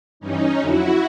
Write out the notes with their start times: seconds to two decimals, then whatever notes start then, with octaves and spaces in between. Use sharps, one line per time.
0.20 G2 E3 G3 C#4 D#4
0.59 F2 D3 F#3 E4 F#4